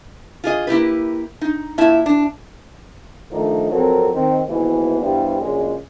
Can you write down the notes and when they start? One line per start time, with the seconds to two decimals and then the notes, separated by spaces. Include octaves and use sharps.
0.44 F4 G#4 D#5
0.67 A#3 E4 G4 B4
1.41 D#4
1.78 A#2 E4 E5 A5
2.06 D4
3.32 D#3 F3 A3 D4 D#4
3.71 F2 F#3 C4 A4 A#4
4.14 D#3 C4
4.47 D#2 G#2 B2 E3
5.01 G2 E3 G3 B3 G4 C5
5.40 A#1 A#2 C#3 F#3 G#3